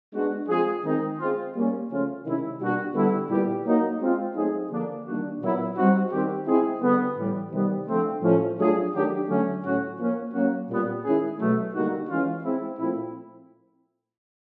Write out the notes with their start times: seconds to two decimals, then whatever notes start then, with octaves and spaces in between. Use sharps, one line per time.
0.14 G#3 B3 D4 F#4
0.49 F3 G#3 C4 F4 G#4
0.84 D#3 G#3 C4 D#4
1.19 G#3 C4 F4
1.54 G3 A#3 C#4
1.90 C#3 F3 A3 C#4 F4
2.25 C3 D#3 G#3 C#4 E4
2.60 B2 G3 A#3 D4 F#4
2.95 D3 G3 B3 E4
3.30 A#2 G3 B3 E4 G4
3.65 F#3 A#3 D#4 F#4
4.01 G#3 C4 F4
4.35 F#3 A3 C4 D#4 G#4
4.71 D3 F3 A#3 D4
5.06 D#3 G3 A#3 D4 F#4
5.42 A#2 F#3 B3 E4
5.76 G3 C4 D#4 F#4
6.11 D#3 G3 C4 D#4 G4
6.47 G#3 C4 E4 G#4
6.81 D3 G3 B3
7.17 A2 E3 G3
7.52 C3 D#3 G3 B3
7.87 D3 F3 A3 C4
8.22 A2 F3 A3 C#4
8.58 F#3 A3 D4 F4 G#4
8.93 D#3 F#3 A3 D4 G4
9.28 D3 F#3 A3 C#4
9.63 A2 F#3 A3 C#4 F#4
9.98 F3 A#3 C#4
10.33 F#3 A#3 C#4 F#4
10.69 A#2 G3 B3
11.04 D#3 G#3 C#4 E4 G#4
11.40 B2 F#3 A3
11.74 D3 G3 A#3 D#4 F#4
12.09 E3 G#3 C#4 F4
12.44 G#3 C4 E4
12.79 A#2 F3 A3 C4 E4